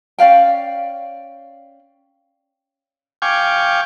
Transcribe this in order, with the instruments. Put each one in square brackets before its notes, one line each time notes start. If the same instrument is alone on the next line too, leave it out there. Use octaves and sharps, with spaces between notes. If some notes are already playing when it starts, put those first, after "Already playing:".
[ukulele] C#4 D5 F5 G5
[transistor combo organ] F5 G5 G#5 C#6 D6